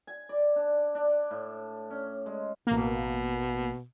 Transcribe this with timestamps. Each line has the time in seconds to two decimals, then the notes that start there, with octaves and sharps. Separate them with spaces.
0.07 G#5
0.29 D5
0.56 D4
0.95 D4
1.31 A2
1.90 C#4
2.26 G#3
2.67 A1 B2 A#3